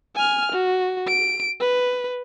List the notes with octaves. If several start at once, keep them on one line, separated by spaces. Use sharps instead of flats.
G#5 F6
F#4
D7
B4